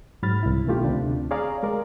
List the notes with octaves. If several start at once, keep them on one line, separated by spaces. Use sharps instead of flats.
G#2 F#3 B5 F6 A6
C2 E4
B2 D#3 A3 F4 G4
D2 C3 D4
G#4 C#5 D5 F5 A#5
G#3 A#4 D5